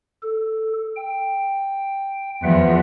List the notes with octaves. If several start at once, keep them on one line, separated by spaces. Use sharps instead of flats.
A4
G5
E2 F3 B4 E5 F#5